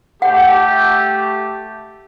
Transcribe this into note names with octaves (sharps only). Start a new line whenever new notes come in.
A3 G4 F#5